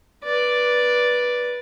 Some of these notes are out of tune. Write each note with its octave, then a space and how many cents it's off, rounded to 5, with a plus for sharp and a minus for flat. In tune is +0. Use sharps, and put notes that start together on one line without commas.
B4 -15 D5 +0